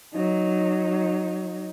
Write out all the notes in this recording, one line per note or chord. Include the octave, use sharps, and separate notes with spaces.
F#3 D#4